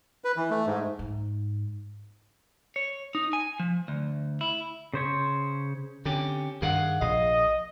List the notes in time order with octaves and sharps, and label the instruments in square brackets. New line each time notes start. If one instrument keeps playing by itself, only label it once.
[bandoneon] B4
E3
A3
G#2
[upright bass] G#2
[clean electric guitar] C#5
D#4
G#5
F3
D2
E4
[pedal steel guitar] C#3 C5 C#5
[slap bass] D3 [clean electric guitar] C4 C#4 G4
[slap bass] G2 D#3 [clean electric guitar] G#4 F5 F#5
[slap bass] A#1 [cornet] D#5 [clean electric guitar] F5